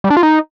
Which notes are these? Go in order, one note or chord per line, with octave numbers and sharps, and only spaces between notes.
G3
D4
F4
D#4